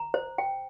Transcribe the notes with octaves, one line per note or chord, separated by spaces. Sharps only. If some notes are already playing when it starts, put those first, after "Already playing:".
Already playing: A#5
C5
G5